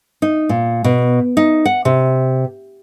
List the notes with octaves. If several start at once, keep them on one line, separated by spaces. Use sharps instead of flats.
D#4
A#2
B2
D#4
F#5
C3